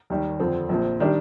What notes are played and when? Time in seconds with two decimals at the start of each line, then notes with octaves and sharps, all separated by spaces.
0.10 D#2 D#3 G3
0.40 F2 D3 F3 C4
0.69 A#1 A#2 F3 C4
1.00 D#3 G3 D4 G4